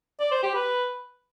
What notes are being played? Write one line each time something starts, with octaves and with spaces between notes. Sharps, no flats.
D5
C5
G4
B4